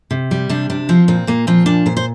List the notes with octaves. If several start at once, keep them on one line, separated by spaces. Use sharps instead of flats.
C3
G3
C3 D4
C3 D4
F3 C4
A#2 C4
A#2 A#3
F3 C4
A#2 D4
A#2 C5
C5